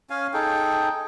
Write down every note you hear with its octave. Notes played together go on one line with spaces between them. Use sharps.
C#4 F5 G#5
D#4 G#4 A4 G5